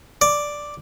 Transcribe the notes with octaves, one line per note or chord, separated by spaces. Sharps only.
D5